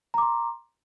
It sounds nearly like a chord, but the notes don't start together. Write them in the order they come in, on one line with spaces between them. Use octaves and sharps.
A#5 D6 C6